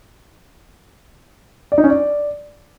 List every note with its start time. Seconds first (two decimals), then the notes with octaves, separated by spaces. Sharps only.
1.72 D5
1.78 D#4
1.84 C#4
1.90 D5